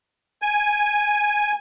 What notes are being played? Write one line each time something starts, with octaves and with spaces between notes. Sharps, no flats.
G#5